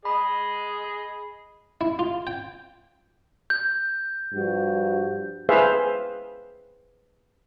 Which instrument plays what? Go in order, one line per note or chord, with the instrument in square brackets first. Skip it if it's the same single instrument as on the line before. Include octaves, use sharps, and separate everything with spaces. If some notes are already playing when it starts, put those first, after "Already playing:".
[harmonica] G#4 D#5 [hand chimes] B5
[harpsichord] E4
F4
G5
[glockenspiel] G6
[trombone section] G2 F3 F#4
[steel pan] G#4 B4 C5 E5 F5